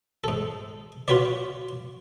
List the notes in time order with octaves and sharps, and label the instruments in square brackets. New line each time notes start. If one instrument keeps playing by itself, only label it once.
[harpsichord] G#2 A4
F4 F#4 B4 C#5 D5